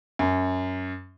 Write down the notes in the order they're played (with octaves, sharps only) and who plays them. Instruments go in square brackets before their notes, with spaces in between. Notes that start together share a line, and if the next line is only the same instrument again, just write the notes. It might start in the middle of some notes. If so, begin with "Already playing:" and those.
[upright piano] F#2